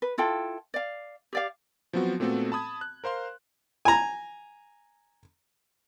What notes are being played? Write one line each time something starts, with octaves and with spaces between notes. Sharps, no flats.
B4
E4 F4 A4 G5
D5 F5
G4 D5 F5
F3 F#3 B3 C4 F#4
A#2 A3 B3 C4 F#4 A4
A5 B5 D#6 G#6
F#6
A#4 C5 F5 C6
G#5 A#5